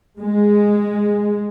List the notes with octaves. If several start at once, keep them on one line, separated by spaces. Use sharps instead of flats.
G#3